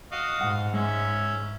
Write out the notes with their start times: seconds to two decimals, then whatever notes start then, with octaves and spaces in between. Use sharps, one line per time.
0.12 F#4 D#5 F5
0.41 G#2 F#5
0.74 G#3 C#4 E5